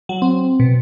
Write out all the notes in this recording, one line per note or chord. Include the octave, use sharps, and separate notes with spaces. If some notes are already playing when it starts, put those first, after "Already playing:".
F#3
C4
B2